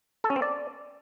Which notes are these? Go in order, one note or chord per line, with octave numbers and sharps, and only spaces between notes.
A4
C#4
C4
D5